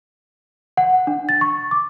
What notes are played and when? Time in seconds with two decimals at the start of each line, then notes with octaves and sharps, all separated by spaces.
0.77 F#5
1.07 D4
1.29 A6
1.41 C#6
1.71 D6